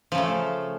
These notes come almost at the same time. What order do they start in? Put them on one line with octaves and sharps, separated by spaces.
F3 C#3 A3